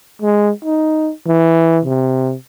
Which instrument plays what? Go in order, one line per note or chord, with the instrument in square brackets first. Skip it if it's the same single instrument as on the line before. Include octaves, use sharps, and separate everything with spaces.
[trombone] G#3
D#4
E3
C3